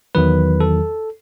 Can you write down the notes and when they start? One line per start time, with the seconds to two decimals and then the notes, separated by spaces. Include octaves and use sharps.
0.15 E2 D#3 F#3 B4
0.60 A4